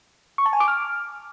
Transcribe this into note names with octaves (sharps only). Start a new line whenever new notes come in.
C#6
A5
G#5
D6
F6